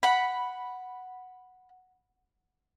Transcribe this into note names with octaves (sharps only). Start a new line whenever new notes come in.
F#5 B5